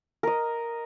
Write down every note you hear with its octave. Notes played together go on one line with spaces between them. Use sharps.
A#4 D#5